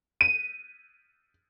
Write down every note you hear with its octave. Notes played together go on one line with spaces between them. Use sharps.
D#7